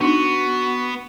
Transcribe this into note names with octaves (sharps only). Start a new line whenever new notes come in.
B3 D4 D#4 F#4